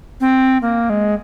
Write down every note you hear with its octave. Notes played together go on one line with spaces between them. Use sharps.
C4
A#3
G#3